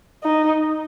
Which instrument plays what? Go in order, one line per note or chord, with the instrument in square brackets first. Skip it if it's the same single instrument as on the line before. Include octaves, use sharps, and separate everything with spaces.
[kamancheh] D#4